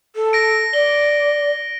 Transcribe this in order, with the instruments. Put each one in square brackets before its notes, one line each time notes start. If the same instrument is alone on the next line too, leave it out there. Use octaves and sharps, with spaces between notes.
[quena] A4
[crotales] A#6 D7
[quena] D5 [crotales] G7